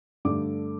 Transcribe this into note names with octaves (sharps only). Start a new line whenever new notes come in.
G2 D3 A3 D6